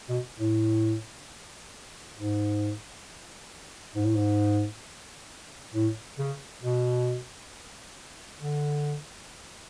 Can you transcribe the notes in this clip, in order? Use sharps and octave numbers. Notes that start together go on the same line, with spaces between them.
B2
A2
G#2
G#2
A2
G#2
A2
C#3
B2
D3